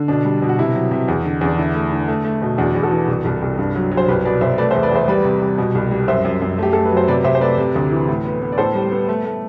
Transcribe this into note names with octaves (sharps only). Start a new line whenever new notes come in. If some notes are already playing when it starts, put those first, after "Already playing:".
Already playing: D3
B2 D4
G3
B2
F#4
C3 E4
F#3
C3
E2
D3
E2 D4
D3 E4
A3
D3
A3
A3
B2
E2 D4 F#4
E2
F#4 A4
E3
C2
C2
C2
G2
F#3
F#3
C5
C2 G4 B4
B2 B4 D5
C2 C5 E5
A3 B4 D5
C5 E5
E2
B4 D5
E2 C5 E5
G3 B4 D5
C3
G3
B2
C2
G3
F#2 C5 E5
F#2
F#2
A3 G4
A3 A4
B4
F#3
C5
C3 B4 D5
C3 C5 E5
C5
A3 B4 D5
C3
D2
E3
A2
B3
B3
D5
A2 A4 C5
G3
B3
A3
A3